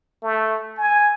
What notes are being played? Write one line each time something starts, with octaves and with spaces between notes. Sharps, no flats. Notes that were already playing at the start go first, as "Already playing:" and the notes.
A3
G#5